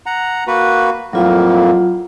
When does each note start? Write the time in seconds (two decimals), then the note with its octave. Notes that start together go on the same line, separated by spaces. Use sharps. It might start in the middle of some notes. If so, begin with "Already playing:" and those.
0.06 F#5 A#5
0.47 A#3 F#4 B4
1.13 F2 A2 F#3 A#3 F4